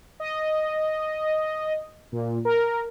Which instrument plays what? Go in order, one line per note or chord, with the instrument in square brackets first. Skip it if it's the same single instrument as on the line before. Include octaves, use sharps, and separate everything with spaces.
[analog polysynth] D#5
A#2
A#4